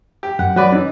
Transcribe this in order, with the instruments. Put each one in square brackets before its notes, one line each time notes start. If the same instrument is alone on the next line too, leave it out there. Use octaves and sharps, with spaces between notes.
[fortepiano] G4
[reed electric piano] F#2 [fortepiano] F#5
[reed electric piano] F#3 [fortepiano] F#4 B4 D5
[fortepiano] E3 [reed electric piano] C#4 D#4